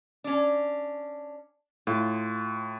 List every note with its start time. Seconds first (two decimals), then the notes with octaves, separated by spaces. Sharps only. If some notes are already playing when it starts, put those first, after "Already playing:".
0.24 C#4 D4
1.87 A2 F4